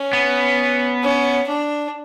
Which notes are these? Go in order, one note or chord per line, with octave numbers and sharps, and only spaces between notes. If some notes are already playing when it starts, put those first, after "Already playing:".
Already playing: C#4
B3
C#4
D4